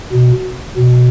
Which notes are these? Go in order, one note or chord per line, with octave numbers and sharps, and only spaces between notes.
B2
B2